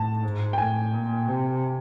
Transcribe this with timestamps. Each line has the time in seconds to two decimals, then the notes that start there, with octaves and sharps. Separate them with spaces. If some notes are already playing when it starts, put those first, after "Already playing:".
Already playing: A2 A5
0.23 G#2
0.53 G5
0.58 A2 G#5
0.93 A#2
1.29 C3